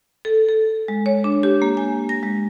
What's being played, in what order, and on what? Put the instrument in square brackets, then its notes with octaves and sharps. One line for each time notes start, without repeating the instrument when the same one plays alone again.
[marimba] A4
A4
G#3
C#5
D4
G4
A#3
G#5
A#6
G#3